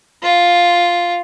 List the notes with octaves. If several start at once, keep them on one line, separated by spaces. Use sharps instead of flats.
F4